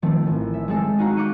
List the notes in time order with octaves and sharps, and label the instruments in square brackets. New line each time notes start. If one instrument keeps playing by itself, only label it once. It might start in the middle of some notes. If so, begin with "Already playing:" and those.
[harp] D#3 F3 A3 C4
A1
E5
G#3 C4 A4
D#4 F#4 F5 A#5
D6 F#6 G6 C#7 D#7